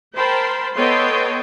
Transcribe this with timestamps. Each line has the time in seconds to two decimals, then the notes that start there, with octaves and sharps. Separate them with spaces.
0.15 A#4 C5 G5 A5 B5 C6
0.76 B3 A4 C#5 D#5 G5 C6